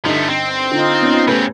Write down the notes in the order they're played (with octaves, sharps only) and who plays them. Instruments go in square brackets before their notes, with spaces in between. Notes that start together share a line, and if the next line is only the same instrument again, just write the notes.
[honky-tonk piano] G2 D3 D#4 [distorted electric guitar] F3 A3
[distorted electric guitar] C4
[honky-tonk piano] D3 [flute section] D#4 F4
[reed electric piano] B3 C#4
[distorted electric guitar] C#3 C4 [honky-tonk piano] A3 G4 B4